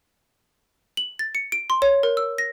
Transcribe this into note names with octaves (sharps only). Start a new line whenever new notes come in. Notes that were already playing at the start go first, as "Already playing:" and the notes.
F#7
A6
C#7
D7
C6
C#5
A#4
E6
A#6